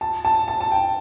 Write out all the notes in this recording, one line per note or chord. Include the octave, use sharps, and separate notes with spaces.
A5
A5
A5
A5
G5